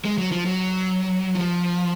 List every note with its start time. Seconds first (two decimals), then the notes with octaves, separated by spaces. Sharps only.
0.05 G#3
0.18 F#3
0.32 F3
0.46 F#3
1.35 F3